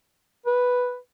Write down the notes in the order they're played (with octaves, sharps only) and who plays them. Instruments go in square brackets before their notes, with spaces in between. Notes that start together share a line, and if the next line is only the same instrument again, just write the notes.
[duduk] B4